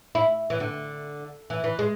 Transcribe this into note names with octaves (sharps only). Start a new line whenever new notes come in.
E4
E3
D3
E3
E3
G#3